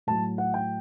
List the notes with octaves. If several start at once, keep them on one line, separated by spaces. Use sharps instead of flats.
A2 F#3 A5
F#5
G5